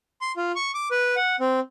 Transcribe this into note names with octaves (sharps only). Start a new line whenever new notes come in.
C6
F4
C#6
D6
B4
F#5
C4